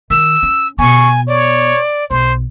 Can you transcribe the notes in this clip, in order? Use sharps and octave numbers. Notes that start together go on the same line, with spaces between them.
D#3 E6
C#4
B2 B3 G#5 C#6
C#5 D5
B1 C5